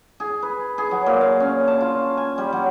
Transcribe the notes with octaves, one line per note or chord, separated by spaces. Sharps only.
G#4
B4
G#4
F#3
A#2
F5
C#4
A5
F4
G#5
G3
F#3